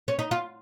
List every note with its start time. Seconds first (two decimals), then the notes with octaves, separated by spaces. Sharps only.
0.08 C#4
0.19 D#4
0.31 F4